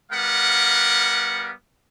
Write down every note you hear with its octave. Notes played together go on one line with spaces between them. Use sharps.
G3 B3 A#4 F5 F#5